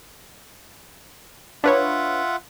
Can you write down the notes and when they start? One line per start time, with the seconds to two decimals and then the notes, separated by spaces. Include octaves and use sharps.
1.64 D4 F4 B4 C#5 E5 F#5